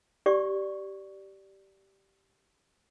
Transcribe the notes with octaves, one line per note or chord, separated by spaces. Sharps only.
G4 D5 C#6